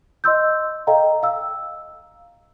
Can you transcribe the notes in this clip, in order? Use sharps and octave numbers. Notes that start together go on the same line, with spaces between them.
D#5 C6 E6 G6
A4 D#5 F5 G5 A#5
F5 E6